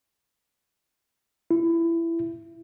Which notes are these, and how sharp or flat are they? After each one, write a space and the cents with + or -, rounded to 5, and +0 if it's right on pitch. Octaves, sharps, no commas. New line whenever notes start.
E4 +15